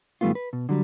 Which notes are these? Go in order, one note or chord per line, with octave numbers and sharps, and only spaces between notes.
G#2 D#3 G3 A3 B3 F4
B4
B2
D3 F#3 G3